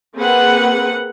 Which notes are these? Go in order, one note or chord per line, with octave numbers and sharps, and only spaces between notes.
A#3 C4 G#4 B4 F#5